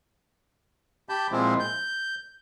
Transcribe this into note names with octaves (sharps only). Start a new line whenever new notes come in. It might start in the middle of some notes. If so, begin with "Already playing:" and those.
G4 A5 B5 G6
A#2 F3 G#3 C4 E4 F4
G6